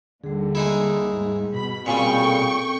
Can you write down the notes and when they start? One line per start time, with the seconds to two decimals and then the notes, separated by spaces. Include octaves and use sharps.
0.24 D#2 D3 G3 G#4
0.55 G#3 D#4 E4
1.13 G#2
1.53 B2 B5
1.86 A#2 C#3 G3 C4 G5 G#5 B5 C#6
2.19 C4 A4